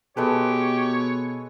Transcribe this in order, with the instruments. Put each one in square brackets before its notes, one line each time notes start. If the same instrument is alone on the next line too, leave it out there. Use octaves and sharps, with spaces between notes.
[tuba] B2 [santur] G#3 A4 B4 [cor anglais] G4 [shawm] C#5